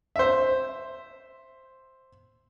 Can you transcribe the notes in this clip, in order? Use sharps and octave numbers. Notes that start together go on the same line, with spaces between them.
C5 E5